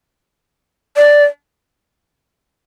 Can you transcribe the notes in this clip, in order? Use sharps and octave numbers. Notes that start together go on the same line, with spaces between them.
D5